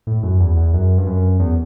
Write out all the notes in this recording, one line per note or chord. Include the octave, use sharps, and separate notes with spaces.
A2
F#2
E2
E2
F#2
G2
F#2
E2